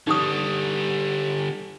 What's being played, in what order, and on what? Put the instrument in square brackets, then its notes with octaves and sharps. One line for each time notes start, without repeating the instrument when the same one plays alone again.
[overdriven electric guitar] D3 G3 [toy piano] D#4 G4 D#6